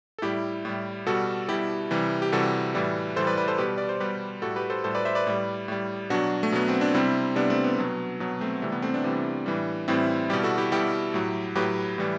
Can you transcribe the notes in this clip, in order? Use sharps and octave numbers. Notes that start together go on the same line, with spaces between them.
A4
A2 G3 E4 G4
A2 G3
B2 G3 F#4 A4
B2 G3 E4 G4
C3 E3 G3
G4
C3 E3 G3 F#4 A4
A2 E3 G3
A2 E3 G3 A4 C5
B4 D5
B4 D5
A4 C5
B2 G3 G4 B4
D5
C5
B2 G3 G4 B4
A2 G3 F#4 A4
G4 B4
A4 C5
A2 G3 A4 C5
B4 D5
C5 E5
B4 D5
A2 G3
A2 G3
B2 F#3 D4 F#4
A3
B2 F#3 B3
C4
D4
C3 G3 C4 E4
C3 G3 B3 D4
A3 C4
B3
B2 F#3
B2 F#3 B3
A3 C4
C3 E3 G3 A3
B3
A3 C4
B3 D4
C3 E3 G3
A2 E3 G3
A2 E3 G3 C4 E4
B2 G3 E4 G4
F#4 A4
E4 G4
B2 G3 E4 G4
A2 F#3
A2 F#3 G4 B4
A2 E3 G3